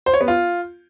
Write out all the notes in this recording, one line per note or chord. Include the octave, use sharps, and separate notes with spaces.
C5
C#5
B3
F4